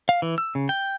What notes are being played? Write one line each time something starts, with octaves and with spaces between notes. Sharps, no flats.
F5
E3
E6
C#3
G5